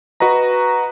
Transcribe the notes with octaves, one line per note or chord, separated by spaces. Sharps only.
F#4 B4 D#5 A#5